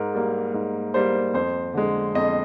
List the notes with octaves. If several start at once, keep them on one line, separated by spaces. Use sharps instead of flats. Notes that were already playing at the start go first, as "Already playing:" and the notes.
Already playing: G#2 A#4
G3 A#3
G#2
G3 A#3 C5
F2 C5
D3 G#3
F2 D#5